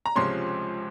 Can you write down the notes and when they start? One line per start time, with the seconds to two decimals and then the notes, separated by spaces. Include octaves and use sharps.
0.06 A#5
0.16 C#2 C3 F3 G#3 C#4 C6